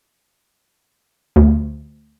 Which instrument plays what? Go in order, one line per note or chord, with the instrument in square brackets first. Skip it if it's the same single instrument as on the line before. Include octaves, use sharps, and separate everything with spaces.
[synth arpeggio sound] D2